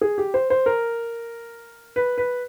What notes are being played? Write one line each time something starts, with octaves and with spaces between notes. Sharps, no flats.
G#4
G4
C5
C5
A#4
B4
B4